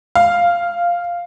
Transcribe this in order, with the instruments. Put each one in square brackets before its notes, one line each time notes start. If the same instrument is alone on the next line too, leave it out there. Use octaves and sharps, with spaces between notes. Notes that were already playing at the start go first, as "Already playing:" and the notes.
[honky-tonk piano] F5